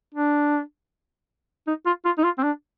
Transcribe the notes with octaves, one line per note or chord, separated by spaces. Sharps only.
D4
D#4
F4
F4
D#4
F4
C4
D4